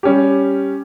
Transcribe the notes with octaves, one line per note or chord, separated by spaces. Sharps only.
G3 C#4 G4